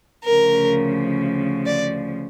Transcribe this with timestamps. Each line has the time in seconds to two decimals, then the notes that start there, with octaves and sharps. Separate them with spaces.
0.25 D2 C#3 F3 A#4
1.66 D5